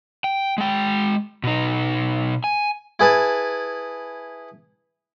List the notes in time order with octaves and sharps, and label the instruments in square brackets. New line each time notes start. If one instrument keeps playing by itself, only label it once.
[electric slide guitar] G5
G#3 G5
B2 D#4
G#5
[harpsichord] E4 G#4 B4 A5